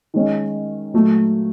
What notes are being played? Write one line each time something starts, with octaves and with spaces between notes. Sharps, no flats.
D#3 G#3 C#4
A#2 F#3 A3